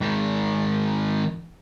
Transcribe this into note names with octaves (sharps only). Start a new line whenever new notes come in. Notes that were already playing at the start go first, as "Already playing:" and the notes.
G#2 D#3